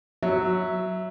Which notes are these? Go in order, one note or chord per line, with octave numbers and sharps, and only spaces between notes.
F#3 E5